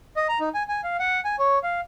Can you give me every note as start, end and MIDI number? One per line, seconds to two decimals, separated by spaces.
0.17 0.27 75
0.29 0.39 82
0.40 0.49 63
0.54 0.63 80
0.69 0.81 80
0.84 0.97 77
0.99 1.21 78
1.25 1.36 80
1.39 1.59 73
1.63 1.81 77